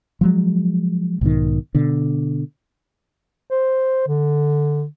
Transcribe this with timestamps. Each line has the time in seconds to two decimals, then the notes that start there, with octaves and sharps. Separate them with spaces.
0.21 F3 F#3 G#3
1.21 B1 G#2 B2 D#3
1.75 B2 D3
3.51 C5
4.08 D3